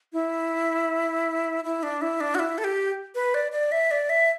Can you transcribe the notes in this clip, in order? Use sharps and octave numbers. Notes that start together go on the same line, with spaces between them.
E4
E4
D4
E4
D4
F#4
E4
A4
G4
B4
D5
D5
E5
D5
E5